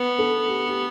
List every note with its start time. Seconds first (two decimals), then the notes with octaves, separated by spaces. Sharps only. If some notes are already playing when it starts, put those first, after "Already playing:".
Already playing: B3 B4
0.18 A4
0.48 G4
0.68 G4